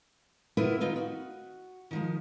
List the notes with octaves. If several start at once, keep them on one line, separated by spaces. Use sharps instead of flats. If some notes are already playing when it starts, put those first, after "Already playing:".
A3 B3 E4 F4 A#4 B4
D#3 C4 D#4 F4
F#4
D#3 F3 G#3